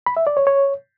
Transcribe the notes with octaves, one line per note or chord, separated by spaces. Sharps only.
B5
E5
D5
C#5
C#5